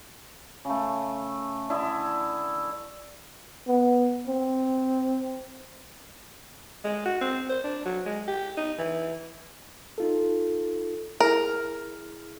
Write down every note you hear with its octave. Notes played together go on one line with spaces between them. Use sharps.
C#3 A3
D3 E4 D#5
B3
C4
G#3
F#4
C4
C5
D4
F#3
G#3
G4
D#4
E3
D#4 F4 A4
E4 G#4 A#4 F6